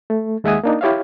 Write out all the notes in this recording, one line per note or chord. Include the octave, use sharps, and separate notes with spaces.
A3
D#2 G#3 E5 F#5 G#5 D#6
A#3 D4 D#4
E4 G4 C#5 E5 F5